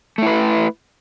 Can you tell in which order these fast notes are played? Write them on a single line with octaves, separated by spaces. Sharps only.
A3 E4 B4